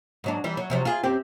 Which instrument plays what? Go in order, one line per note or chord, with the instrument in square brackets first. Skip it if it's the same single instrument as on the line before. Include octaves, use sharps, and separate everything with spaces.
[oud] G#2 F#3 D4
E3 G3
F#3
C3 F3 F#3
F4 G#4
F#2 C4 G4